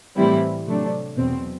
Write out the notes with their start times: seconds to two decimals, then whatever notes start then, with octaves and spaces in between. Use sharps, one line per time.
0.16 A2 E3 G3 C4 E4
0.66 C3 F#3 A3 D4
1.17 E2 B2 F#3 C4